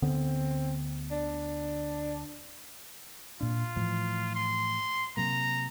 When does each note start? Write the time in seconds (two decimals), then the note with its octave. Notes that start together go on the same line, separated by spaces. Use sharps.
0.02 D2 D3 B3 C4
1.11 D4
3.41 A#2 D4 F4
3.76 A2 E3 F3
4.35 C6
5.17 C3 F#3 A#3 A#5